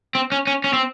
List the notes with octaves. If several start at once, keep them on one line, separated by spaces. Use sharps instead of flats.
C4
C#4
C#4
C#4
C4